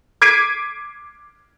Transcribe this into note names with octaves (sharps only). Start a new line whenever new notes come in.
D6 G#6 B6 C7 D7 D#7